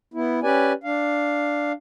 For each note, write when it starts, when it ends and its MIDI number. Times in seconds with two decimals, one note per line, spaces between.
0.14 0.40 59
0.14 0.40 64
0.43 0.73 61
0.43 0.73 67
0.43 0.73 71
0.43 0.73 74
0.43 0.73 80
0.84 1.72 62
0.84 1.72 77